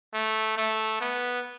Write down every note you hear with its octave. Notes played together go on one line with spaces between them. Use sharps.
A3
A3
B3